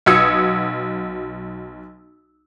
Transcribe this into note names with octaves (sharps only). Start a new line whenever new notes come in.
B1 F#4 D#6 E6 G#6 C#7